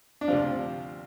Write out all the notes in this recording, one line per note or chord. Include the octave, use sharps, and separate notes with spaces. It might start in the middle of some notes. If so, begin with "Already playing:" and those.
D4
D2 C3 F3 F4